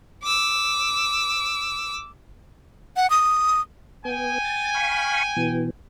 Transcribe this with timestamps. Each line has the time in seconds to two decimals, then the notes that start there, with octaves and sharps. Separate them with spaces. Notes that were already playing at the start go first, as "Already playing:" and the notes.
0.23 D6 E6
2.96 F#5
3.10 D#6
4.05 B3 G5 G#5
4.45 A6
4.74 F5 B5 C#6
5.36 B2 E3